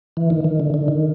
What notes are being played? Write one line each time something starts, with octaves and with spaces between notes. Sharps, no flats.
E3
D#3
D#3
D3
D3
D#3